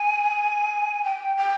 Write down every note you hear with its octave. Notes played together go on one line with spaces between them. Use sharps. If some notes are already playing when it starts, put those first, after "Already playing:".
Already playing: G#5
G5
G5